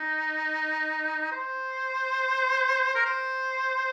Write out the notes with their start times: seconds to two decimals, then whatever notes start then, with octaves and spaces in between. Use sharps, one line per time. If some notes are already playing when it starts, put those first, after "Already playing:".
Already playing: D#4
1.32 C5
2.95 A#4
3.05 C5